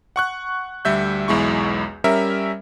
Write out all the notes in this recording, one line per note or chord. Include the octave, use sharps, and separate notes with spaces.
F#5 C#6 F#6
D2 G3 E5 G6
B1 E2 G#3 E4 C#6
G3 C#4 A#4 E5